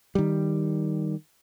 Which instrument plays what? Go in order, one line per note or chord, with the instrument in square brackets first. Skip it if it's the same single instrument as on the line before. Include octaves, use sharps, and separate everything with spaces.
[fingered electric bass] D#3 G3